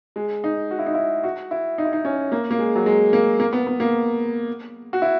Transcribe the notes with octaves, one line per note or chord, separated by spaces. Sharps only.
G#3
D#4
F#4
E4
D#4
E4
F#4
E4
D#4
E4
D#4
C#4
A#3
A#3
G#3
F#3
G#3
A#3
A#3
B3
B3
A#3
F#4
E4